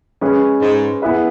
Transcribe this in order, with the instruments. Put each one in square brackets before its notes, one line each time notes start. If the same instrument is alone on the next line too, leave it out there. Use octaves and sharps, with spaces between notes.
[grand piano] G#3 C#4 G#4 B4
[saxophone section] G#2
[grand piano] B3 E4 G#4 B4 E5